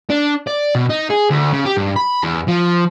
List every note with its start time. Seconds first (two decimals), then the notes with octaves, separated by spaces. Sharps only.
0.10 D4
0.47 D5
0.75 B2
0.90 D#4
1.10 G#4
1.30 D2
1.52 C#3
1.65 G4
1.77 G2
1.96 B5
2.23 E2
2.48 F3